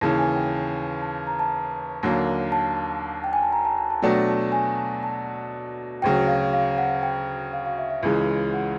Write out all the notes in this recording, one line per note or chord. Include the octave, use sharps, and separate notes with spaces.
D#2 C#3 E3 A5
G#5
G5
A5
A5
A#5
A5
D#2 D3 F#3 A#3
A5
G5
G#5
A5
A#5
A5
A5
A5
B2 F#3 A3 D4 G5
A5
G#5
A5
A5
D2 C#3 F#3 G5
F5
F5
F#5
G5
F5
F5
E5
E5
C#2 C#3 E3 G#3 F5
F#5